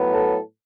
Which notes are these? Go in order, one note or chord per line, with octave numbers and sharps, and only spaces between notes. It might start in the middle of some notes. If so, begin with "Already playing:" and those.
Already playing: A2 F#3 B3
A4